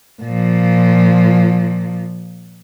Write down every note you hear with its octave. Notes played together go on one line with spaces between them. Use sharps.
A#2 F3